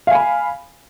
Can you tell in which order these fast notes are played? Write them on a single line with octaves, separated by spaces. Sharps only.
F5 G#5 B5